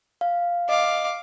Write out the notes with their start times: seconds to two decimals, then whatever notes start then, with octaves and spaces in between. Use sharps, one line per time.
0.21 F5
0.69 D#5 F5 D6